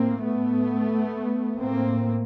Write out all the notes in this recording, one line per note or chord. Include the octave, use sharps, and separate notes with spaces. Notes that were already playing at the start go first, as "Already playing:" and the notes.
Already playing: A2 A#3 C4
A3 B3
A2 A#3 C4